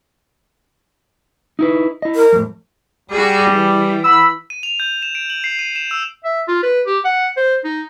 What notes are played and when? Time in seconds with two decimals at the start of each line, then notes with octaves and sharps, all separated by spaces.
1.59 D#4 E4 B4
2.02 E4 D#5
2.15 A#4
2.33 F2 A2
3.11 G3 F#4 G#4
3.50 E3
4.04 F#5 B5 E6
4.50 D#7
4.63 F7
4.80 G6
5.02 E7
5.15 D7
5.30 F#7
5.44 C7
5.59 D#7
5.76 E7
5.91 E6
6.25 E5
6.48 F4
6.63 B4
6.87 G4
7.05 F#5
7.37 C5
7.64 D#4